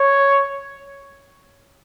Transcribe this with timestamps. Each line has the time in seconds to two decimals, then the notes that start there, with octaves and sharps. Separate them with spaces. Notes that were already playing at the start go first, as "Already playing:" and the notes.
Already playing: C#5